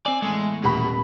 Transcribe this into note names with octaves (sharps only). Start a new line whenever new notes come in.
C4 D5 G#5
E2 A2 G#3 A3
D#1 B2 B5